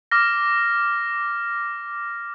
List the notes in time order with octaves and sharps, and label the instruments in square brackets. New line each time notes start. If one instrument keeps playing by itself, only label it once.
[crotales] D6 F6 A#6